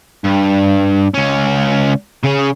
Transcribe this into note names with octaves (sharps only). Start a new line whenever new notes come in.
G2
C#2 C#4
C#3 G#4